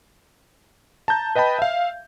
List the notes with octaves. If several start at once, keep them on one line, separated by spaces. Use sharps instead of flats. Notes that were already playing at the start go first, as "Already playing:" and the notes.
A5 A#5 G6
B4 D#5 G5 A5 B5
E5 F5